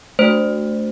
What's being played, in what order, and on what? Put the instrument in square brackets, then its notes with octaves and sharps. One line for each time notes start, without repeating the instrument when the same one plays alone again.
[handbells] A3 D4 F#4 C5